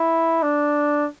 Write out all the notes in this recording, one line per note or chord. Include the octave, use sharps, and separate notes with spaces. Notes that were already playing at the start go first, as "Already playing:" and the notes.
Already playing: E4
D4